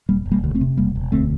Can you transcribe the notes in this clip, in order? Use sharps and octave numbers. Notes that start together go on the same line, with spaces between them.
E1 G3 A#3
E1
G3 A#3
D2
A3 C4
C3
E1 G3 A#3
E1
D2 A3 C4